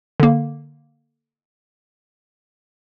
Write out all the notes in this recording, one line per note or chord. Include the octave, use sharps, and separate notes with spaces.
D3 A#3